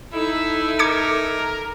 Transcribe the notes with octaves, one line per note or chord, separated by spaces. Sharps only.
D#4 E4 A4 E5
A#4 D6 G#6 C#7